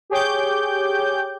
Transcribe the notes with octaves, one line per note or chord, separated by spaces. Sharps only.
G4 G#4 C#5 G5 D6 G6